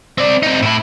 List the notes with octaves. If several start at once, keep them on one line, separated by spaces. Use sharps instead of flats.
C4 D5
C4 D#4
A2 E4